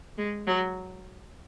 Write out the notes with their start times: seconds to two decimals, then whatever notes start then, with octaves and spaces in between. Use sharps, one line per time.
0.18 G#3
0.47 F#3